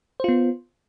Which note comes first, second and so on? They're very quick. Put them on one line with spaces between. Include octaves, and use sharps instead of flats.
C5 F4 B3